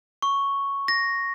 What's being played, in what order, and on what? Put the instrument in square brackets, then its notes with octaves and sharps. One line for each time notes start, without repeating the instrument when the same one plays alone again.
[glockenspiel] C#6
A#6